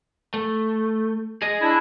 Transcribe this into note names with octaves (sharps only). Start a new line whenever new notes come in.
A3
G#4 D#5
D4 E4